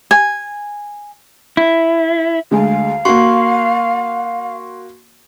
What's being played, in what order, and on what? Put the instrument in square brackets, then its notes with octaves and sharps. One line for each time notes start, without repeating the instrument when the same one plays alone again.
[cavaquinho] G#5
[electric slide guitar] E4
[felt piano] D2 G#3 [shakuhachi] F5
[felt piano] A#3 F#4 [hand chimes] C6 C#6 C7